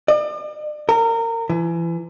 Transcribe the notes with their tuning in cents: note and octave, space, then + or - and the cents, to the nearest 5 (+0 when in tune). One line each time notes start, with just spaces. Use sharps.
D5 +40
A#4 -25
E3 +30